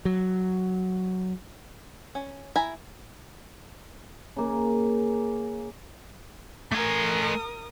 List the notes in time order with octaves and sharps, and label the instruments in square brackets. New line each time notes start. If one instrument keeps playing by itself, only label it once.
[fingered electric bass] F#3
[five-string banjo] C#4
E4 G#5 A#5 B5
[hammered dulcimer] C#3 A#3
[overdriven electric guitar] A3 G#5 [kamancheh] A#4 D#6